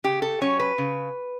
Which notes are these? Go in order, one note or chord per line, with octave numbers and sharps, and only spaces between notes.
C#3 G4
A4
F#3 C#4 C#5
B4
C#3